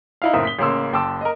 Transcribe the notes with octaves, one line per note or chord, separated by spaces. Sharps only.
D#4 E4 F5
F#1 A2 C4 A#4 E5 D#6
B6 G7
A1 C#3 A#3 C6 E6
F#1 G5 A5 C6 D6 E6
A#4 D#5